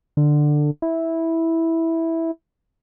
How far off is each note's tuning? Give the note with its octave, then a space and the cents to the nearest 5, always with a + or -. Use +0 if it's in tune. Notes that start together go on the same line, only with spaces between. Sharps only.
D3 +15
E4 -10